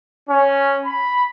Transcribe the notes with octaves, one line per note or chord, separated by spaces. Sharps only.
C#4
B5